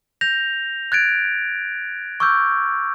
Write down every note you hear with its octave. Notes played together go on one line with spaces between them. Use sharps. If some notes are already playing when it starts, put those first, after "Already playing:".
G6 A#6 F7
F#6 G#6 A6 D7
C#6 D6 E6 F6 G6